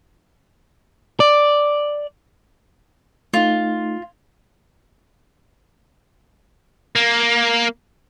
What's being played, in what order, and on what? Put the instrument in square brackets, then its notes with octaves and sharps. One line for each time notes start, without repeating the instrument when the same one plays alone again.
[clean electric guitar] D5
[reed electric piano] A3 D#4 [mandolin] F4
[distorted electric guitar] A#3